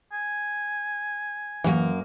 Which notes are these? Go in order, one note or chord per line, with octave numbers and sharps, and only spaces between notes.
G#5
F#2 E3 A#3